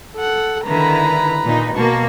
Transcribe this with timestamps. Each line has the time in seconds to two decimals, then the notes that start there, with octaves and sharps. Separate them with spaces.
0.15 A4 F#5
0.66 D3 D#3 E4 B4 A#5
1.45 A#2 D#4
1.75 B2 A#3 A5 C#6